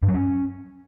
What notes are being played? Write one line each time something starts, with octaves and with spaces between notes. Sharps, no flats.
G2
F#3
C#4